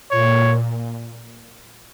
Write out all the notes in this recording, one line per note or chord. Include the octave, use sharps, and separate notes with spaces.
A#2 C#5